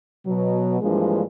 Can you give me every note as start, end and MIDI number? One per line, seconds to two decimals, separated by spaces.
0.25 0.77 47
0.25 0.77 54
0.80 1.22 43
0.80 1.22 52
0.80 1.22 53
0.80 1.22 56
0.80 1.22 58
0.80 1.22 62